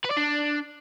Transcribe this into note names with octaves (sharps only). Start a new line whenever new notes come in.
B4
D5
D4